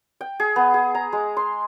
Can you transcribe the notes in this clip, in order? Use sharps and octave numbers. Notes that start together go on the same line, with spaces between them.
G5
G#4
B3
G#4
A#5
G#3
C6